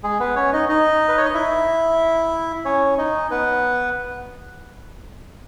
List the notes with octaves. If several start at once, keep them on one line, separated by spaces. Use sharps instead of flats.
G#3 G#4
B3 B4
C#4 C#5
D#4 D#5
D#4 D#5
B4
C#5
D#5
E4 E5
C#4 C#5
D#4 D#5
B3 B4